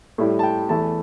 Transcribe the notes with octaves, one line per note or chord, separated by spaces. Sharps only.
A2 G3 E4
A5
G5
E2 E3 A3 E4 A5